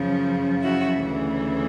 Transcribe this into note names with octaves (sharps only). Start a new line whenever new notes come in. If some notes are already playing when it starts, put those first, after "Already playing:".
Already playing: F#2 C#3 F3
E4 F#4
D2 C#3 E3